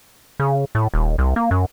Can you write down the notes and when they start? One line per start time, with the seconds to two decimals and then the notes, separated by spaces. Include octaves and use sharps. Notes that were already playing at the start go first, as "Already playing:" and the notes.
0.40 C#3
0.75 A2
0.94 D#1
1.18 C2
1.36 A#3
1.51 F#2